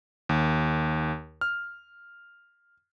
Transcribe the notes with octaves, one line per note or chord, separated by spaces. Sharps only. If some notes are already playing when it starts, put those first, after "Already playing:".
D#2
F6